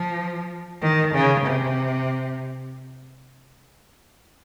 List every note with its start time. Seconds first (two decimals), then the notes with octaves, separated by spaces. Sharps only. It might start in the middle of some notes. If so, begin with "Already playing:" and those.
Already playing: F3
0.81 D#3
1.14 C#3
1.45 C3